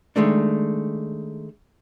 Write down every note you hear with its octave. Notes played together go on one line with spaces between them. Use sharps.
D#3 G#3 A3 D4